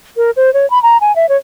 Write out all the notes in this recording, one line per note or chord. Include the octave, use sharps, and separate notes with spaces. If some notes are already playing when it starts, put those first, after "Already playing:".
A#4
C5
C#5
B5
A#5
G#5
E5
C#5